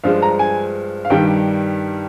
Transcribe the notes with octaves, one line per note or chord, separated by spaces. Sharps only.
G2 F3 G#3 F5
A#5
G#5
F5
G2 D#3 G3 G5